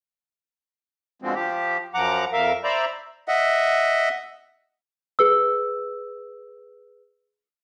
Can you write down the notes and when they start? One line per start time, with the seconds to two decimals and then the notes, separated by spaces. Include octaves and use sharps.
1.22 B2 D3 F3 G#3 C4
1.35 F3 G4
1.94 F#2 F3 F#5 A#5 D6
2.33 F2 A#4 E5 F5
2.64 C5 D5 E5 A#5 B5
3.28 D#5 E5 F#5
5.19 G#4 B4 E6